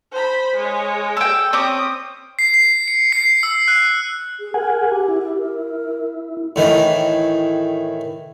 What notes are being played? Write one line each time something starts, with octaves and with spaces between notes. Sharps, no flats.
C5 B5
G#3 C#5
A4 G5
C4 C#4 D6 D#6
C7
C7
C#7
C7
E6
F#6
G#4
G#4 A#4 F#5 G#5
G4
E4
A#4
A2 D#3 E3